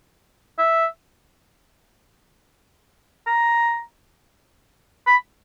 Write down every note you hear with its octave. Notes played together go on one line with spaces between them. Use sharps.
E5
A#5
B5